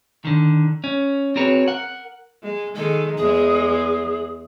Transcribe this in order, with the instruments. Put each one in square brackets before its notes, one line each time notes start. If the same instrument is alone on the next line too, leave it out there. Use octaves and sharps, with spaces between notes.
[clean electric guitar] D3 D#3
C#4
C4 F#4 G#4 A#4 B4 C#5
A#4 F#5
[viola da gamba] G#3
[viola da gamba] D#3 G#3 [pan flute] A4
[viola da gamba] E2 G#3 [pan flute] G#4